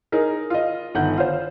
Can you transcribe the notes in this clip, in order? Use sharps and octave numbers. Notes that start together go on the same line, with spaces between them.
D#4 G#4 A#4
F4 D#5
G1 D#3 F#5 G6
F4 C5